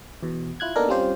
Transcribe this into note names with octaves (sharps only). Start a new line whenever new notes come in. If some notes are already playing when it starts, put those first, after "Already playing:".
E2 B2
E4 F4 F#6 G#6
A#3 B3 D4 D#4 A4 A#4
G3 C4 C#4 F4 G4 C5